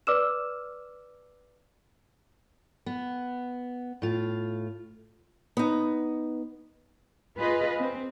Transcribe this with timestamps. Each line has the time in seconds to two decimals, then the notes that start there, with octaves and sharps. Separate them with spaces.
0.07 B4 D5 D6 E6 F6 E7
2.86 B3
4.02 A2 F4
5.57 B3 D#4
7.38 F4 G#4 B4 D#5
7.80 C4